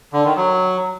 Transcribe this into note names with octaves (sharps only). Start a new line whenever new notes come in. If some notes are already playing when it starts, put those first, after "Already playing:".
D3
D#3
F#3